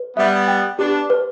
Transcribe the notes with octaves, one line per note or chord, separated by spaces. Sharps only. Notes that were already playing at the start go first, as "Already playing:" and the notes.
Already playing: B4
G3 B3 E5
G5
B3 D4 G4
B4